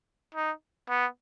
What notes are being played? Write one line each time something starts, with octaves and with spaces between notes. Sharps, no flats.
D#4
B3